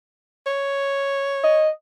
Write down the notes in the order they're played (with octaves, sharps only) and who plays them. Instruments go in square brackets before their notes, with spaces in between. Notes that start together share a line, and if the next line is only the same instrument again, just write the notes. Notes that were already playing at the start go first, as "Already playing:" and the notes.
[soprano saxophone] C#5
[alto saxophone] D#5